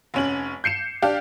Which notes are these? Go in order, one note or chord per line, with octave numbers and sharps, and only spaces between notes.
F1 C#4 F#7
G6 C7 C#7 E7
D4 G4 F5